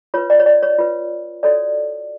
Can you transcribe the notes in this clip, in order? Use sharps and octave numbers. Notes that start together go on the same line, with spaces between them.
F4 B4 C#5
D5
C#5
D5
C#5
F4 B4
F#4 A4 C#5 D5